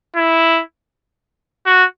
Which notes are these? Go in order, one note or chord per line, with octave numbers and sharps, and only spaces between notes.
E4
F#4